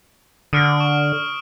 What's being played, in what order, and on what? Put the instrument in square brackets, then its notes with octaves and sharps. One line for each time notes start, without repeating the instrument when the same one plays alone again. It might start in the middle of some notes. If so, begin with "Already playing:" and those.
[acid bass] D3 [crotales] D#6 F6 D7
[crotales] C#6